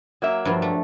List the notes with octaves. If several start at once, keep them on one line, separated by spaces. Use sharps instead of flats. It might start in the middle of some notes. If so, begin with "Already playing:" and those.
F#3 A#3 E5
G2 F3
A3